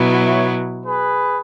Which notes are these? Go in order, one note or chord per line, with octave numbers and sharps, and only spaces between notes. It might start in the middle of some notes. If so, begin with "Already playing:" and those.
Already playing: B2 F#3 B3 E4
C#5 E5
G#4 B4